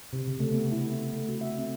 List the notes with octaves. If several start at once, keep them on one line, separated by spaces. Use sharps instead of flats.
C3
C#3
A3
B3
E4
C4
A3
F#4
E5
C4